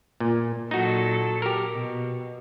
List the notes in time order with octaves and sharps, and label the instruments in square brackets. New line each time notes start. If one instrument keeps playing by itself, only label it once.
[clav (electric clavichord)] A#2
[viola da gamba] A#2 F#3 A4 [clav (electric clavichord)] D#4 F#4
[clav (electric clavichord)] G4 A#4
[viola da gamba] B2